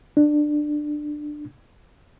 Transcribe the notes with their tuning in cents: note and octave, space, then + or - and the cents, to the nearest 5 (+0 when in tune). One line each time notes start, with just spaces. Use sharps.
D4 +15